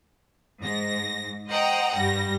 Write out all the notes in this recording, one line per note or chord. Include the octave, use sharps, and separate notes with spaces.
G#2 A#6
C5 D#5 F#5 G5 A#5
G2 G3 A#6